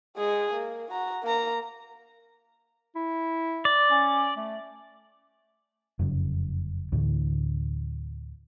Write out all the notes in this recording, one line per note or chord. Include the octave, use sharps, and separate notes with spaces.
G#3 G#4
A#3
F#4 A#5
A#3 A#5
E4
D5
C#4
A3
F1 F#2 C#3
D2 A2 D3 E3